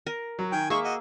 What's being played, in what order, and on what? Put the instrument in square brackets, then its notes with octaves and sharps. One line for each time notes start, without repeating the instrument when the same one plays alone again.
[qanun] A#4
[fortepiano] F#3
[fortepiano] D#3 [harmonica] G5 G#5
[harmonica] G#3 C#6 [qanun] A#3 E5 [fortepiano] G#4
[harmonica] F#4 D#5